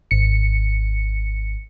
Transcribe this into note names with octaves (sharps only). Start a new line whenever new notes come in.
G#1 C#7